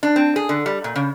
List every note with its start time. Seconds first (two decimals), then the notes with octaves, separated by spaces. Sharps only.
0.03 D4
0.16 C4
0.36 G#4
0.49 D3
0.66 G3
0.84 A#2
0.96 C#3